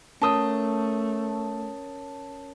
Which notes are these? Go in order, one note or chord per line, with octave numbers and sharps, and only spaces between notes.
A3 C#4 A#4 C#5 A5 D#6